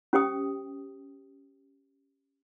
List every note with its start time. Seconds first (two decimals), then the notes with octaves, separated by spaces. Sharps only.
0.13 C#4 G4 C5 G5 D#6